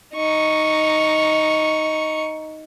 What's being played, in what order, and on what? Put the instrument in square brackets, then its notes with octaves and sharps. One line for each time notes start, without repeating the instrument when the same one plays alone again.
[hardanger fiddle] D#4 C#6